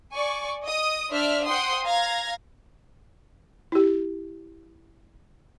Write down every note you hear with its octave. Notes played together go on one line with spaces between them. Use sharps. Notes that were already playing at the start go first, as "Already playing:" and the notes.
D5 G#5 C#6
D#5 D#6
D4 C5 D5 E5 F6
C5 F#5 G5 C6 D#6
F5 A#5 G#6 A#6
E4 G4